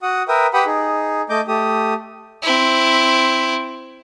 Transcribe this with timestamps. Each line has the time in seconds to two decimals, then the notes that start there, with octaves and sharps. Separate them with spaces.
0.03 F#4 F#5 D#6
0.28 A#4 B4 E5 G5 D#6
0.54 G4 B4 F#5 G5 B5 D#6
0.66 D#4 G#4
1.30 A3 D#5 D6 G6
1.48 A3 G4 D#6
2.43 C4 E4